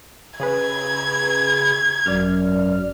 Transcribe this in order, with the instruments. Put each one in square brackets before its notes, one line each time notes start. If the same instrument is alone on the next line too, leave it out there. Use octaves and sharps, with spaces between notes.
[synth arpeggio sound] C#3 G#4 B4 [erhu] G#6
[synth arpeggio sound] G#1 D5 F6 [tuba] F#2